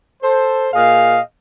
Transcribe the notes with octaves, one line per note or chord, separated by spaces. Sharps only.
A4 C5
A#2 G#4 D#5 F5